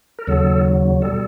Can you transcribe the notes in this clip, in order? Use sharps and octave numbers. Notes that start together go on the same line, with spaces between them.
A#4
D#2 C#3 F#3 A4
G3 A4
B2